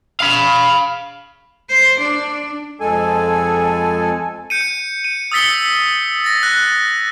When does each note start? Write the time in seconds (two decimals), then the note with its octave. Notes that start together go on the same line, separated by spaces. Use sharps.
0.21 F5 B5
1.69 C5
1.99 D4
2.80 F2 G#3 A4 G#5
4.50 G6 C#7 D#7
5.04 D#7
5.32 D#6 E6 A6 B6 C#7 G7
6.24 A6 A#6
6.43 F#6